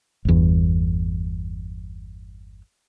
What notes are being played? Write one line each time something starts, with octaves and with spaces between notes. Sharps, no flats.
G1 E2